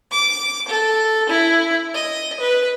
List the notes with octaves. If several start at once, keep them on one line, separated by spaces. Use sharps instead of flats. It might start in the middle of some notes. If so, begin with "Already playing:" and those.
D6
A4
E4
D#5
B4